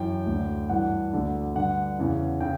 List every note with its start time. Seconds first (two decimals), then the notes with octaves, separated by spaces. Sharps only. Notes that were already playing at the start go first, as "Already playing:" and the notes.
Already playing: F#2 E3 G5
0.26 D2 D3
0.69 G2 E3 F#5
1.13 D2 D3
1.55 G2 D3 F#5
1.97 E2 C#3 E3
2.41 C#3 G5